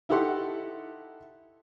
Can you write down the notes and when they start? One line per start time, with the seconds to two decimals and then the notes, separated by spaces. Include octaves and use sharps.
0.09 D#4 E4 G4 A4 F#5 C6